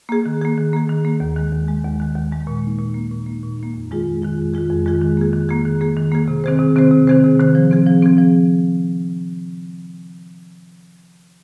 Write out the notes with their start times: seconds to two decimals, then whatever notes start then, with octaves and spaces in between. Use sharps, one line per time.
0.09 A#3 G#4
0.26 D#3
0.41 A#3 G#4
0.58 D#3
0.73 A#3 G#4
0.89 D#3
1.05 A#3 G#4
1.20 D#2
1.36 D#3 G#3
1.52 D#2
1.68 D#3 G#3
1.85 D#2
2.00 D#3 G#3
2.16 D#2
2.32 D#3 G#3
2.47 A#2
2.64 A#3 D#4
2.79 A#2
2.94 A#3
2.99 D#4
3.11 A#2
3.26 A#3 D#4
3.43 A#2
3.58 A#3 D#4
3.74 F2
3.91 D#3 G#3 F4 G#4
4.06 F2
4.22 D#3 G#3 F4 G#4
4.38 F2
4.54 D#3 G#3 F4 G#4
4.70 F2
4.86 D#3 G#3 F4 G#4
5.02 D#3
5.17 A#3 G#4
5.33 D#3
5.49 A#3 G#4
5.65 D#3
5.81 A#3 G#4
5.97 D#3
6.12 A#3 G#4
6.28 C3
6.44 D#3 C4 G#4 C5
6.59 C3
6.76 D#3 C4 G#4 C5
6.91 C3
7.07 D#3 C4 G#4 C5
7.24 C3
7.39 D#3 C4 G#4 C5
7.55 F3
7.71 C4 G#4
7.86 F3
8.03 C4 G#4
8.18 F3